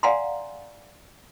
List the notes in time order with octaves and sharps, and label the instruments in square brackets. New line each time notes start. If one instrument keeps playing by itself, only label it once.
[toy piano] D5 F5 F#5 G#5 A#5 C6